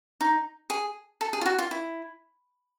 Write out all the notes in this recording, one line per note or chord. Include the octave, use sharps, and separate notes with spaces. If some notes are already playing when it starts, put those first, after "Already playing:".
D#4
G#4
A4
G#4
F4
F#4
F4
E4